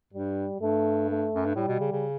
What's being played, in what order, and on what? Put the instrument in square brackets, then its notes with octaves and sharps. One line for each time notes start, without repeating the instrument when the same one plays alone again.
[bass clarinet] G2 [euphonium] G3
[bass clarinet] G2 [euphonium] A3
[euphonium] A3
[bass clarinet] F#2
G2
[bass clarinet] A2 [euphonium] G3
[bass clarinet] B2
C#3
C#3